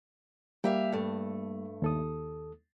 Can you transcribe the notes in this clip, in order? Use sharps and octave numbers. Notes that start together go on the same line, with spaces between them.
G3 A#3 G4 E5 F5
G2 A3
D#2 A4 D#6